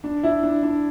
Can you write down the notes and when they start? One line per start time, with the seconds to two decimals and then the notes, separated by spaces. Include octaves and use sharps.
0.04 D4
0.23 E4
0.43 D4
0.63 D4